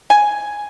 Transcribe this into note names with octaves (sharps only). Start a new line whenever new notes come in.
G#5